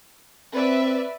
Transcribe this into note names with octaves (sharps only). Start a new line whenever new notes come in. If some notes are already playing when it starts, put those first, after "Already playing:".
C4 B4 D5 E5